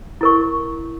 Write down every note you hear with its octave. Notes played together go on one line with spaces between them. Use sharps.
E4 A#4 C#6